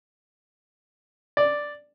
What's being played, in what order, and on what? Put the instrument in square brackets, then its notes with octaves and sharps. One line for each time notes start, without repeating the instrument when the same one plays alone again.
[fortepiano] D5